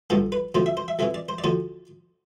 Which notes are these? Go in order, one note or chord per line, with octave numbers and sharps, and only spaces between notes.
A1 G2 D3 F3 A4
B4
D2 C3 F3 C5
E5
C5
E5
F2 C3 E3 E5
D5
C5
D5
D2 D3 F3 C5